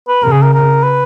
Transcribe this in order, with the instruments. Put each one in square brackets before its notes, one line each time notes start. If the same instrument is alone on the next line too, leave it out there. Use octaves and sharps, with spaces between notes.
[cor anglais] B4
[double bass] C#3 [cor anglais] A#4
[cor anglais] G#4
A#4
A#4
B4